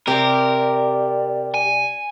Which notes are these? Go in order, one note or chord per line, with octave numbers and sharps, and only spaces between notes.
C3 C4 G4 A#4 D5
G#5